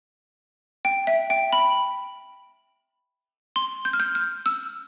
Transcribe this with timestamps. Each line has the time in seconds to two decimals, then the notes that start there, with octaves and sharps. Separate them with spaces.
0.85 G5
1.07 E5
1.30 G5
1.53 B5
3.56 C6
3.85 G6
3.93 F6
4.00 G6
4.15 F6
4.46 E6